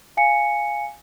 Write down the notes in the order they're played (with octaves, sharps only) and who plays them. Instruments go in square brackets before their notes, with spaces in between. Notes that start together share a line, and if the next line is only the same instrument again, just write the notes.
[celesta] F5 G#5 C#7